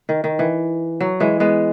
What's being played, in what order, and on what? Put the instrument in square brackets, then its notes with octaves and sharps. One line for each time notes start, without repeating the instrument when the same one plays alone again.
[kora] D#3
D#3
E3
F#3
E3 G#3
G#3 B3